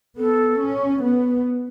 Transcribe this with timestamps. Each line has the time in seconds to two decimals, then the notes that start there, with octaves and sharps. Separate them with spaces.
0.17 B3 A4
0.60 C#4
1.03 B3